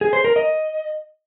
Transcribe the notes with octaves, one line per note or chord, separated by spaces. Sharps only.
G#4
C5
A#4
D#5